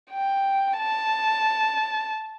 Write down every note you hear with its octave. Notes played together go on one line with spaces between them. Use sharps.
G5
A5